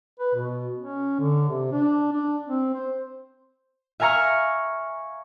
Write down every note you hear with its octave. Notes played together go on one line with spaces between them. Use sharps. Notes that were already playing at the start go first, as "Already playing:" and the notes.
B4
B2
C#4
D3
C3
D4
D4
C4
C5
E5 F5 G#5 A#5 C#6 F6